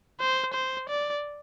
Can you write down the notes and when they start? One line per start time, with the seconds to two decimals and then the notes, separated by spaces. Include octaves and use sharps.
0.20 C5
0.53 C5
0.89 D5